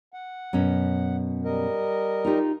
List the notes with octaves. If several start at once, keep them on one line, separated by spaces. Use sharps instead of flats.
F#5
F#2 B2 C#4
G3 A#4 D#5
D#4 F4 G4